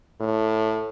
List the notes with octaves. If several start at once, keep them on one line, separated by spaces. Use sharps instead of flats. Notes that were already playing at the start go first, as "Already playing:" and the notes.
A2